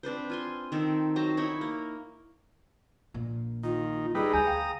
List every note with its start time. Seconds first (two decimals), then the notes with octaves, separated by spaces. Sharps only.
0.03 C4 D4 B4 C5
0.30 F4 G#5 C6
0.72 D#3 C4 A4
1.16 F#3 C5 A5 A#5
1.37 D#4 E4 C#5 B5
1.61 A#3
3.14 A#1 A#2
3.63 D#3 F4
4.15 G3 D#4 G#4 B4 E6
4.33 D2 G#5 A#5 D#6 G6
4.47 F5 G5